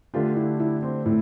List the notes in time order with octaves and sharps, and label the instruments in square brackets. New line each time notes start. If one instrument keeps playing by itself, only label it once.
[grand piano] D3 A3 D4 G4 [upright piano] F4
[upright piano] E4
E4
C4
[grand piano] A2 [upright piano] E4